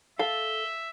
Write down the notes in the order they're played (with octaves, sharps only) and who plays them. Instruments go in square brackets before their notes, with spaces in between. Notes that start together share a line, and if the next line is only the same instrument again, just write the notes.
[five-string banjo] A4 [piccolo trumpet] E5 [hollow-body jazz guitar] F5 [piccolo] G7